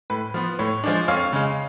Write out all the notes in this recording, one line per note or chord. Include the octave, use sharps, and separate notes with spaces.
A2 B4
F3 B3
A2 C#5
F3 G#3 D4
F2 C#5 F5
C#3 G#3